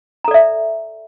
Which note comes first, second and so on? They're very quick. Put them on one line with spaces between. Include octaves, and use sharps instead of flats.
A#5 A4 D5 E5